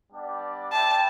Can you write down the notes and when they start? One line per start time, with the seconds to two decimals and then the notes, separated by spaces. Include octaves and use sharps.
0.12 G3 B3 D4 G4 D5
0.71 E4 B4 E5 G5 A5